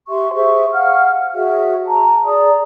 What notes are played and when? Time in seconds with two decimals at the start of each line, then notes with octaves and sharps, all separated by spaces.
0.09 G4 E5 C6 C#6
0.33 G#4 C5 E5 C#6
0.72 F5 F#5 F6
1.33 F#4 G#4 C#5 E5
1.87 A5 A#5
2.24 G#4 D5 A#5 D#6